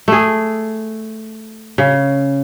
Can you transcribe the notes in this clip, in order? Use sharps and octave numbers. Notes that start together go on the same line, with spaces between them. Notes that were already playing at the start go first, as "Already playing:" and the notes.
A3 G#4
C#3